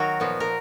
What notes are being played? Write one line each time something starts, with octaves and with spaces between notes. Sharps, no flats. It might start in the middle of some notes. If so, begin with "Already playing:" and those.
Already playing: D#3 F#3 F#4 A#4
A#2 F3 B3
A#4